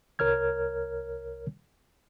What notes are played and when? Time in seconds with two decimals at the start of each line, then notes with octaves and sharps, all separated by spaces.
0.19 C2 A#4 C#5 F6 G#6